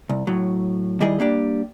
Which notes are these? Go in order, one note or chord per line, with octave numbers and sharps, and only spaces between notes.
C2
A2 F#3
D#3 G3 E4 G#4 D#5
G3 A#3 D4 G4